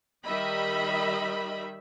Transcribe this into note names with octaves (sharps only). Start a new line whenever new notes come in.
D#3 G3 D#5 E5 B5